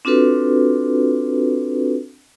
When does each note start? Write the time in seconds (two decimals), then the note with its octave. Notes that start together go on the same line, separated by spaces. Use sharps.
0.05 C4 D4 F4 F#4 A4 B4